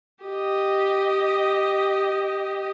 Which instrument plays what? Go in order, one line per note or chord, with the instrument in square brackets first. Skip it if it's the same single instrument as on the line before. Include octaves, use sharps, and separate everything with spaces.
[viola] G4 D#5